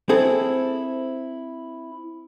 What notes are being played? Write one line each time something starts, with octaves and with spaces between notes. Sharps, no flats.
C4 E4 G#4 A4